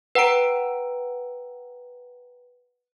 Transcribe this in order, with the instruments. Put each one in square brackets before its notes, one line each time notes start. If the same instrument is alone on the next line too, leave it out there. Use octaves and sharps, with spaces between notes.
[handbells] B4 F#5 G5 A#5 D7